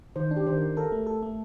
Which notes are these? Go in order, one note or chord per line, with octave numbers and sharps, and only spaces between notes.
D#3 C5
D4
G4
D#3 C5
A#4
D#3
A4 A#4
A3
A4
A3